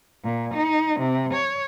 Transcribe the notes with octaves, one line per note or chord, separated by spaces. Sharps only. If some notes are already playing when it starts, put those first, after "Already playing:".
A#2
D#4
C3
C#5